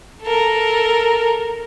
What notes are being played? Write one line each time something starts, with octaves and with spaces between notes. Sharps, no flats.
A4 A#4